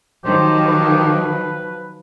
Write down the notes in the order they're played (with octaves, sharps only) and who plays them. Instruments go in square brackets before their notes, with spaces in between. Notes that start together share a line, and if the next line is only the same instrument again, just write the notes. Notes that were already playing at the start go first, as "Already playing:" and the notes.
[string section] D#3 [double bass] F3 F#3 [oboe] G4 [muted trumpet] C5
[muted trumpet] B4